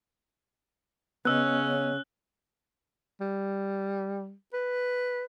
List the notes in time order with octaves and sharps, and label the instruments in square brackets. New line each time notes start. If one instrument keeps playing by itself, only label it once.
[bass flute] C#3 [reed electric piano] B3 D#5 [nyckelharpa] C#4 [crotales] E6 F#6
[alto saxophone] G3
B4